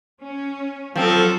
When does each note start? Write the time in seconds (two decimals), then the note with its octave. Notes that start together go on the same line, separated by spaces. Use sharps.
0.23 C#4
0.96 F3 F#3 C4 F4 A4